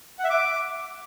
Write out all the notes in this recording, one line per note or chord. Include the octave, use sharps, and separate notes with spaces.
F#5
E5
D6